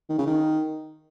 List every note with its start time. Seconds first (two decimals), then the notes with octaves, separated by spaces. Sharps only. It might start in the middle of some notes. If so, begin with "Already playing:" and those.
0.09 D#3
0.18 C#3
0.27 D#3